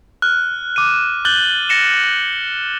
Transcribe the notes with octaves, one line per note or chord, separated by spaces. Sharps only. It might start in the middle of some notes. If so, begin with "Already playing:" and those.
F6 F#6
D6 D#7
D6 F#6 G6 A6 F#7 G7
A6 A#6 C#7 E7